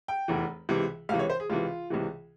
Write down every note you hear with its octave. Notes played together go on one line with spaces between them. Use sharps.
G5
F1 E2 E3
C#2 C3 E3
C#2 C3 E3 F5
C#5
C5
G#4
C#2 C3 E3 F4
C#2 C3 E3